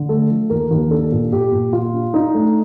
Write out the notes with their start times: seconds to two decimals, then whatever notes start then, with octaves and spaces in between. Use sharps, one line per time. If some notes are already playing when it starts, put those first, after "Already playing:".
Already playing: D3
0.09 A3 A4
0.30 F3
0.50 D#2 A#4
0.71 D#2
0.91 D4 A4
1.12 A#2
1.32 A#2 G4
1.52 A#2
1.73 A#2 F4
1.93 D4
2.14 D4 D#4
2.34 A3